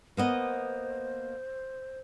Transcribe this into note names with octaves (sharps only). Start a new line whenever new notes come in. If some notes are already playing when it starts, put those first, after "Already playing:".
A#3 B3 C5 D#5